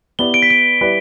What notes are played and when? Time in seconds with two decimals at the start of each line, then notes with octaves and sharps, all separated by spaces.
0.19 B3 E4 G4 B4 D5 G7
0.34 D7
0.42 B6
0.50 D7
0.81 G3 E4 B4 D5